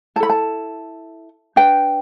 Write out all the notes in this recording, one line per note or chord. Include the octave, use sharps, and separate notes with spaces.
E4 A4 A5 B5
A5
D4 B4 G5